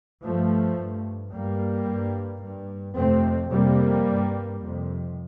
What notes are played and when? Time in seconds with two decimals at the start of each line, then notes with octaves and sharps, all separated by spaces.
0.23 G2 F3 A3
0.78 G2
1.32 G2 G3 A#3
1.87 G2
2.42 G2
2.96 F2 C3 A3 C4
3.51 F2 C3 G3 A#3
4.06 G2
4.61 F2 C3